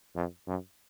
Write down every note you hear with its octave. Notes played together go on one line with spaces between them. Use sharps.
F2
F#2